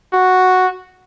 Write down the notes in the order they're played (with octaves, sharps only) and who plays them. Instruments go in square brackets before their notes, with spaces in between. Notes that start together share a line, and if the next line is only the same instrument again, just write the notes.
[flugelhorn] F#4